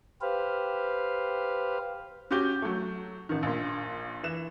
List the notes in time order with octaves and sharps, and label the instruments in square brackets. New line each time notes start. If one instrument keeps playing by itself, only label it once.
[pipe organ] G4 B4 C5 F5
[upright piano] C#4 F#4 G4 D6 G6 G7
F#3 A3
A1 D#3
A#1 A#2
E3 E7